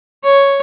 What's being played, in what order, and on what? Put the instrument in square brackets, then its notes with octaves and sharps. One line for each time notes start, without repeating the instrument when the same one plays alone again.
[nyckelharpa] C#5